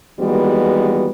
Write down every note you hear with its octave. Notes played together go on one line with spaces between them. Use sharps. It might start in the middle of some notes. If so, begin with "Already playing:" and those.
D#2 E3 G3 G#3 B3 F#4